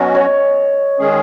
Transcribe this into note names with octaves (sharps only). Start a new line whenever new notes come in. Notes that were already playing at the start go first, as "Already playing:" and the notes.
Already playing: B2 F#3 C#4 F#4 D#5
C#5
D#3 G#3 C#4 G#4